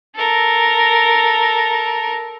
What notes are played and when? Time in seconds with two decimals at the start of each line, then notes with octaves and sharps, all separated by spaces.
0.15 A4 A#4